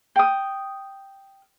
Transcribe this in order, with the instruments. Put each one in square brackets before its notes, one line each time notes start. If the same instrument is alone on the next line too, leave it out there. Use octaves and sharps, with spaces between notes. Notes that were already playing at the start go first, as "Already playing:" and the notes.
[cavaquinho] G5 D#6